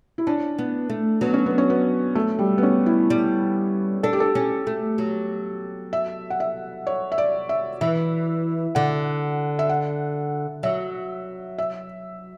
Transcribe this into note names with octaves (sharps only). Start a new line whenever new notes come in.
E4
C#4 D4
B3
A3
F#3 B3
C#4
B3
C#4
B3
A3
G3
B3
C#4
E4
G3
D4 A4
G4
A4
C#4
A3
F#3
E5
F#5
E5
C#5
E5
D5
E5
E3 E5
D3 F#5
E5
F#5
F#3 E5
E5